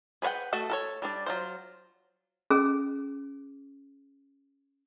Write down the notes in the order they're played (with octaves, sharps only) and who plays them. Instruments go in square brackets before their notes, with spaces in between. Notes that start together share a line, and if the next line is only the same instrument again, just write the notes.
[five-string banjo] G#4 B4 C#5 F#5 G5
A3 F#4 A4
A4 A#4 C#5
G3 D4 D5
F#3 F4 C5
[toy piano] C#4 G#4